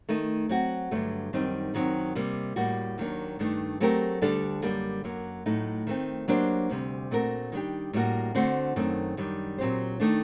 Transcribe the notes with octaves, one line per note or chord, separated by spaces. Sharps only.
D#3 A3 D#4
F#3 C4 F#4
G2 D3 F#3 A3
F#2 D#3 G3 C4 D#4
F#2 D#3 F#3 C4
C3 G3 A#3
A2 G3 A#3 F#4
D#2 D#3 F#3 A#3 D4
G2 D#3 A3 D4
F#3 A3 C4 G4 A#4
D2 D3 G3 D4 A4
F#2 D3 G3 A#3
F#2 F#3 A#3
A2 F#3 A3 D#4
D#3 A3 C4
F#3 A#3 D4 G4 C5
D2 C3 G3
A#2 A3 C4 F#4 A#4
D#3 G3 D4 G4
A2 G3 A#3 F#4
D3 A3 C4 F#4 C5
F#2 D#3 A3 C4
F#2 D#3 G3 D4
A#2 F#3 C4 G4 C5
D#3 A3 D4